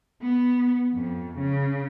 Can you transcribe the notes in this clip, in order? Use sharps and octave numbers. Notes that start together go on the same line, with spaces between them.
B3
F2
C#3